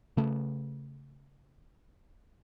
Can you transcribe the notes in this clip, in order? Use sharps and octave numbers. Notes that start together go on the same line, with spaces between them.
C#3 A3